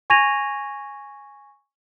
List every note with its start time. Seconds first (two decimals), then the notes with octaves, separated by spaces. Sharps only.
0.10 G#5 C#6 G#6 A#6 D#7 F7